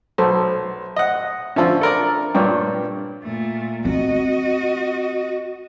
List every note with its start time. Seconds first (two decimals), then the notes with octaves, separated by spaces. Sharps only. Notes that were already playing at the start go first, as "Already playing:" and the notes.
0.18 B1 A4 C5
0.96 D#5 F#5
1.56 D3 F3 C#4 D4 E5 A5
1.81 A4 A#4 D5
2.35 G2 A#2 C#5 D5 G5
3.23 A#2 A3
3.85 C4 F#4 D#5